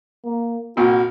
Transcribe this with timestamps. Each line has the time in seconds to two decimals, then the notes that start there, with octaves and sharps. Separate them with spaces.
0.25 A#3
0.77 C2 A#2 F#4